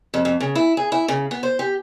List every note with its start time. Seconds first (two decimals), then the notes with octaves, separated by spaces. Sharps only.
0.14 F2
0.25 F2
0.40 C#3
0.55 E4
0.77 G#4
0.92 E4
1.08 C#3
1.31 B3
1.43 C5
1.59 G4